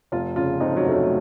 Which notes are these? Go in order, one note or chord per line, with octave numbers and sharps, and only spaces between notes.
F1 F4
C#3 F4
F2 D#4
F#3
F1 A3
F#3